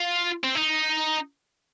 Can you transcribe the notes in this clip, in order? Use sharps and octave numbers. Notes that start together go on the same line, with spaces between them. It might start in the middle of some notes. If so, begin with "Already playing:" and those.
Already playing: F4
C4
D#4